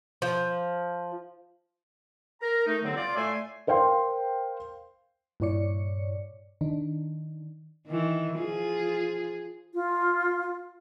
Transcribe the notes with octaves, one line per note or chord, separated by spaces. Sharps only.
F3
A#4 A#5
A3 D#4
G2 D3 F#3 B3 C4
F4 D5
A2 A3 D5 E5 G#5 C6
A#4 C5 F5 G5 C6
G2 A#2 E4 C#5 D5 C#7
D#3 D4 D#4
D#3 E3
F3 F4 G#4
F4